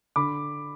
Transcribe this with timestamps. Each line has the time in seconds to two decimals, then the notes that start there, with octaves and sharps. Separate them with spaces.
0.16 D3 B5 D6